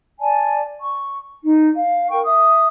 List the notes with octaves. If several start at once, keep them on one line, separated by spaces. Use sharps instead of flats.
D5 G#5 A5
C#6
D#4
F5
A#4 G5 C#6
E5 D#6